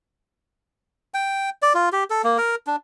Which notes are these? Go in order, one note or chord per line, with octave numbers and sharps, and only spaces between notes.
G5
D5
F4
G4
A4
A#3
A#4
D4